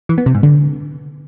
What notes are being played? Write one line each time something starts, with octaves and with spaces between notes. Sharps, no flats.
E3
B3
C3
G#2
D3